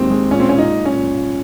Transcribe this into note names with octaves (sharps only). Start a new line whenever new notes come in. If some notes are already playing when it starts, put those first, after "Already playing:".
Already playing: D#2 D#3 G#3 C4 D#4
G#3
A#2 C#4
C4
A#2 C#4
D#4
A#2
C#4
A#2
A#2